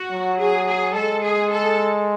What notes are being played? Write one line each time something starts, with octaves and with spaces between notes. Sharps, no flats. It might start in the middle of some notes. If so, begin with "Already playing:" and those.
Already playing: F#4
F#3
G#4
G#4
G#3 A4
G#4
A4